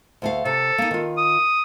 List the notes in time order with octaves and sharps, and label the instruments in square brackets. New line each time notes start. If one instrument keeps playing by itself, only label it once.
[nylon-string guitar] D2 A3 F5
[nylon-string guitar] C3 [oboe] A4
[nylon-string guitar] A#3 D#4
D#3 F4
[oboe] D#6